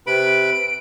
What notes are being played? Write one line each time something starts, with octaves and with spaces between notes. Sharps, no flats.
C3 B4 B5 D7